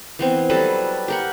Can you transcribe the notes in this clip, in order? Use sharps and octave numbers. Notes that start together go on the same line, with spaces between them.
E3 B3 C4
F#3 G3 A4 B4
G4 A#4 F#5